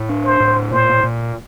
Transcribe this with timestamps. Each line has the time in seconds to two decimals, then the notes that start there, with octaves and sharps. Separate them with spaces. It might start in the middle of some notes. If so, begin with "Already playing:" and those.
Already playing: A2
0.09 D4
0.24 C5
0.40 A2
0.71 A#2 C5
1.04 A#2